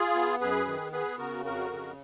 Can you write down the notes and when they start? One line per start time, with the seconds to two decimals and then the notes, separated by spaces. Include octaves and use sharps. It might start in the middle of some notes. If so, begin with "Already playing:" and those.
Already playing: F4 G#4
0.15 B3
0.41 F#2 G#4 B4
0.67 D#3
0.92 B3 G#4 B4
1.19 C#3 F#4 A#4
1.45 F2 F#4 A#4
1.71 C#3